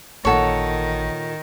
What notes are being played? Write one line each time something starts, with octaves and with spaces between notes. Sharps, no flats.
A1 A#2 D#3 A4 C#5 F#5